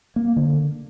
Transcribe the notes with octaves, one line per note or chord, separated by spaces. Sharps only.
A#3
D3